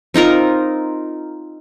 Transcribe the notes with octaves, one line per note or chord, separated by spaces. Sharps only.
C4 D#4 F4 A#4